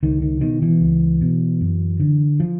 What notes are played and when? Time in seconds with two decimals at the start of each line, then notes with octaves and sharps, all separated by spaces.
0.03 C#2 D#3
0.22 D#3
0.41 B2 D#3
0.62 E3
0.81 C#2
1.21 B2
1.61 F#2
2.00 D3
2.40 F3